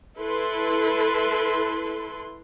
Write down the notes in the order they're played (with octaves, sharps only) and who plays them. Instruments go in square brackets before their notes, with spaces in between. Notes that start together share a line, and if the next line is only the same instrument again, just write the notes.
[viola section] E4 A4 B4 C6